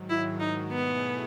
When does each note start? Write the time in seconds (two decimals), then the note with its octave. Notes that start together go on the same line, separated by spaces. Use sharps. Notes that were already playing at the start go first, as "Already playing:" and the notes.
Already playing: G#2 D#3 F#3
0.10 E4
0.40 D#4
0.71 B2 A3 B3 E4 G#4